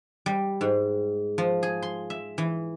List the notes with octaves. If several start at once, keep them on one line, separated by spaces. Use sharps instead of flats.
G3
G#2
F3
G#4
C6
E5
E3